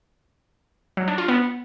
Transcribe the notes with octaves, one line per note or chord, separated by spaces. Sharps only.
F#3
D4
F4
B3